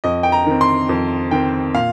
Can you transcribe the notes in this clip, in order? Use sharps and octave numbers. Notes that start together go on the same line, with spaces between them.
F2 D#5
G5
A#5
D#3 C4
C6
F2
D#3 C4 G5
A#2 F5